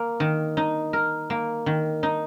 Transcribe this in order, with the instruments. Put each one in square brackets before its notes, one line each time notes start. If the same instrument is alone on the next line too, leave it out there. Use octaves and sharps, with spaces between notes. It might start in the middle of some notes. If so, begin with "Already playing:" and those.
Already playing: [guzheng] A#3
D#3
D#4
A#4
A#3
D#3
D#4